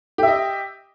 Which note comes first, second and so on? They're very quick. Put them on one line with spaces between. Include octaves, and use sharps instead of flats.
G4 E5 D#5